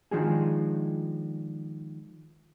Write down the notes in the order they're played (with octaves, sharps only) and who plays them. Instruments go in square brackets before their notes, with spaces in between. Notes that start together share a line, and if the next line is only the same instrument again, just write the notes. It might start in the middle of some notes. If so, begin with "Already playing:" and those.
[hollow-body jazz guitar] D#3 F3 G#3 D4 F#4 G#4